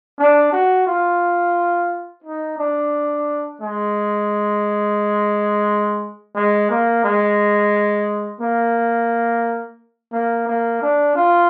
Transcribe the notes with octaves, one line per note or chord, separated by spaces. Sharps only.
D4
F#4
F4
D#4
D4
G#3
G#3
A#3
G#3
A#3
A#3
A#3
D4
F4